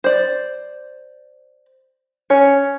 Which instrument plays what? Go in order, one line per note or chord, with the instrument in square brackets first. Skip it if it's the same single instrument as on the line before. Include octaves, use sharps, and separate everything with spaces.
[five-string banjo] C5 D5
[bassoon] C#4 [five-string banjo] C#5